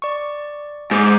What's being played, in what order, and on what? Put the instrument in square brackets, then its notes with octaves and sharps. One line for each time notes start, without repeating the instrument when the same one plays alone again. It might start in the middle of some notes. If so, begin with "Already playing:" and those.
[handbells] D5 C#6
[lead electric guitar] G#2 [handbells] D6 G6